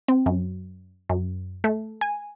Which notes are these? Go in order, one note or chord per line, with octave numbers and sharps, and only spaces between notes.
C4
F#2
F#2
A3
G#5